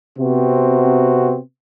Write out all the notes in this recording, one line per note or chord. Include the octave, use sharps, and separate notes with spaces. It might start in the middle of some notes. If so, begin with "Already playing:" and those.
C3 B3 C4 F#4